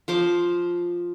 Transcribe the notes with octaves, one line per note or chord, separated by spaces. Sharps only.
F3 C5 D6